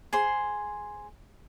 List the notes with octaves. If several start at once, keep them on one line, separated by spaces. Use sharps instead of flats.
G#4 C5 C6